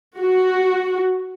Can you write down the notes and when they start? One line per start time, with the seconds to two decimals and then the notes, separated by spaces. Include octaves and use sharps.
0.20 F#4